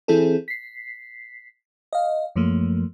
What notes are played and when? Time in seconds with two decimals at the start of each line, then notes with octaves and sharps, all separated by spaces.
0.08 E3 C4 E4 G#4 A4
0.48 B6 C7
1.93 D#5 F5
2.36 F#2 F3 A3 A#3